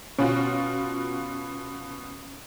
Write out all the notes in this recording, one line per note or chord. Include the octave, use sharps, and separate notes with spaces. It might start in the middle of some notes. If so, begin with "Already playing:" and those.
B2 C#4 F4 F#4